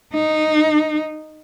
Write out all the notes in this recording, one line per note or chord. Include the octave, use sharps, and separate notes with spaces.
D#4